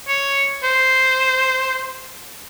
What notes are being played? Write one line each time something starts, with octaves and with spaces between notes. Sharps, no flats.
C#5
C5